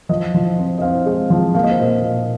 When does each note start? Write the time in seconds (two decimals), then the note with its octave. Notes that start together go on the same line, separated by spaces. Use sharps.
0.09 F3 D#5
0.34 F3
0.58 C4
0.78 D#5
0.82 C4 F5
1.06 G#3
1.30 F3
1.55 A#3 F5
1.63 D#5
1.71 C5
1.79 A#2 D#5
2.03 A#2